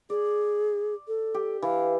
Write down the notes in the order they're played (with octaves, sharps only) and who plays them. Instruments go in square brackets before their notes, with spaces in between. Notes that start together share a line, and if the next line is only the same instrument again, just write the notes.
[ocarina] G#4 [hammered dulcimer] D5
[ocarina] A4
[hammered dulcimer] G4
[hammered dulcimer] E3 [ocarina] F5